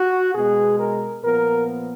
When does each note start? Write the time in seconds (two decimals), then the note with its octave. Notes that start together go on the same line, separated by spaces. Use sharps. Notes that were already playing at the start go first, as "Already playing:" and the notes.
Already playing: F#4
0.34 B2 G#3 B3 G#4
0.79 A#4
1.23 A#2 F3 B3 A#4